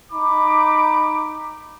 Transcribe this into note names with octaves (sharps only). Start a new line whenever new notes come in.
D#4 B5 D6